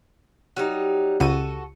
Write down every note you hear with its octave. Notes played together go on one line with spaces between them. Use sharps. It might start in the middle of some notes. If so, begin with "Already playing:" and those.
F#3 G3 D#4
C#2 F#4 A4 D#7